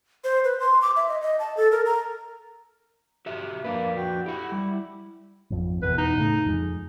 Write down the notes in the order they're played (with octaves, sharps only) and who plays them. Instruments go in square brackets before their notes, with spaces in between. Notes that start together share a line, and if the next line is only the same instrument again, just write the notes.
[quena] C5
B4
C6
D6
E5
D#5
D#5
A5
A4
A#4
A#5
[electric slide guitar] F#4 G4 E5
[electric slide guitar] F2 D4 B4 [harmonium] A#3
[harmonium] F#4 G5
[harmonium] E4 [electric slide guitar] G4 F#5
[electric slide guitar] G3
[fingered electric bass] G#1 F2
[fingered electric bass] E2 B2 [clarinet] B4
[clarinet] D#4
[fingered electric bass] A2 C#3 A3
F2 G#3